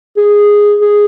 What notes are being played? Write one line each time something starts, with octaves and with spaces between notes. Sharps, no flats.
G#4
G#4